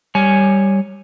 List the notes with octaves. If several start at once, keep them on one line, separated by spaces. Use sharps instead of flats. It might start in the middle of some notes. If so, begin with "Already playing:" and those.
G3 C#5 G#5